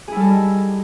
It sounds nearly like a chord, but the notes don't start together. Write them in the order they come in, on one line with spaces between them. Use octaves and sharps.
G#4 E4 G3 A4 D#4